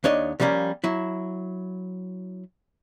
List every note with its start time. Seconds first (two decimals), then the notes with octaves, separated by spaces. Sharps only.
0.04 D#2 D4 C#5 D#5
0.40 D3 F3 G3 A#3 C#4
0.84 F#3 E4